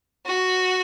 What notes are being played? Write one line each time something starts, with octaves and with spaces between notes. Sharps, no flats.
F#4